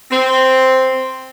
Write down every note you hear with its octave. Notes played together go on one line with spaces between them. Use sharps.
C4